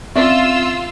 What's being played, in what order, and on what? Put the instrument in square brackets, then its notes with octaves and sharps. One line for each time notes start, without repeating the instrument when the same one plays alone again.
[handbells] C4 C#4 [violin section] F4 E6 [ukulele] D5 E5